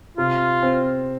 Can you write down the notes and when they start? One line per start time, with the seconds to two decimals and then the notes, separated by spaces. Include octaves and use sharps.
0.17 C3 F4
0.63 C4